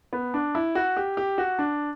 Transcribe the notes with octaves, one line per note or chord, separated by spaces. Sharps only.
B3
D4
E4
F#4
G4
G4
F#4
D4